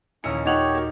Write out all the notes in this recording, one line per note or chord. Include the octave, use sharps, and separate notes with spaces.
D#2 A#2 C#4 E4 D#5 A#5 E6 C#7
D#4 F4 G4 C#5 F#5 F7 F#7
F#4 A#4